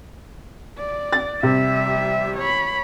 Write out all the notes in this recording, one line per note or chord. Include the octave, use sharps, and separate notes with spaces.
D5
A6
C3 G3 E5
C#5 B5